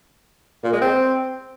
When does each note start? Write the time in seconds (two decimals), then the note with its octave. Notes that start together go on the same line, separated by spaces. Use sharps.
0.64 A#2
0.73 G#3
0.82 C4